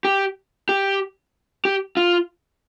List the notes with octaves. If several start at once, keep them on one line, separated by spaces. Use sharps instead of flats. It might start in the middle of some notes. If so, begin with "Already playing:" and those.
G4
G4
G4
F4